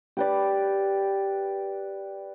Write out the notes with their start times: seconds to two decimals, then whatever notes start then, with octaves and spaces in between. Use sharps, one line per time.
0.17 G4 B4 D5